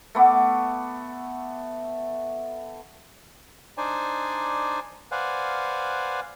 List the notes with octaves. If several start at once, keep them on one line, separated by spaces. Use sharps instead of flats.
A3 B3 D6
D4 D#4 C5 D5 G#5
B4 C5 D5 F5 F#5 G#5